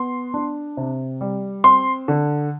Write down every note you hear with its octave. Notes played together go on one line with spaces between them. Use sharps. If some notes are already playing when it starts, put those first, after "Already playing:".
Already playing: B3 C6
D4
C3
G3
C4 C6
D3